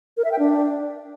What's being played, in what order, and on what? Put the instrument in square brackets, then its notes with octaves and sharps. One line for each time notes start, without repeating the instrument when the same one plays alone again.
[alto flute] A#4
E5
G5
D4